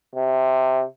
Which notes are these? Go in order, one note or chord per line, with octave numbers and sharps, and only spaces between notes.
C3